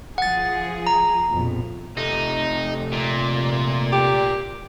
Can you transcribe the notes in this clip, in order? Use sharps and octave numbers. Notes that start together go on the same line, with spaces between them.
F3 G#4 F#5 A6
A#5
A#1 F2 B2
C3 A3 D#4
A#2
G4